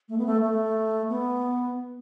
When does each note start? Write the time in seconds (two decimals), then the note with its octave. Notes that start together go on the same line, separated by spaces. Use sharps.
0.09 A3
0.18 B3
0.26 A3
0.42 A3
1.09 B3